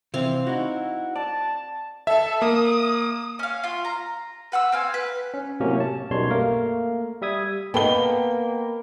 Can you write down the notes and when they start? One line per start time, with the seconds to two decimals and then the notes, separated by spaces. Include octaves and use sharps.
0.14 C3 E3 C4 F5
0.47 D#4 E4 F#4 F#5
1.16 D5 A5
2.07 A4 E5
2.42 A#3 D#6
3.39 C#4 F5
3.64 F4
3.85 A#5
4.52 B4 F#5 C6 E6
4.72 C4 F5 G#5
4.94 B4
5.34 C#4
5.60 A2 C3 F#3 A#3 C#4
5.80 A5
6.10 B1 F#2 B2 G3 C#5 C6
6.29 A3 A#3 A#4 F5
7.22 G3 E5 D#6 G#6
7.74 A#3 B3 A4 D#5 G5 B5 G7